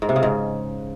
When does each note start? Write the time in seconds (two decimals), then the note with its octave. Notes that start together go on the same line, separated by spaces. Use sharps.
0.02 G#2
0.09 C3
0.16 C#3
0.23 G#2